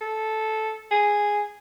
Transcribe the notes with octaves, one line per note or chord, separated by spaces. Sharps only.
A4
G#4